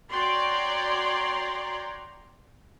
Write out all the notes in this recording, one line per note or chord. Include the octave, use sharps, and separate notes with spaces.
F#4 C#5 D5 G5 A#5 C6